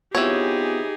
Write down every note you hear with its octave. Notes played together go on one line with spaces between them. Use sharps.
E3 B3 C4 D#4 F4 G4 G#4 C#5